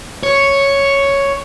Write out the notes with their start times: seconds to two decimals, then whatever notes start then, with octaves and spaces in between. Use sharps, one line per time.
0.23 C#5